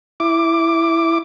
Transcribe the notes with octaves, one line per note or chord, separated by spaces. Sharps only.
E4 D6